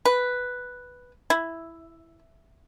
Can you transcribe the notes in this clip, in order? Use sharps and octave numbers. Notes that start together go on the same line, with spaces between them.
B4
E4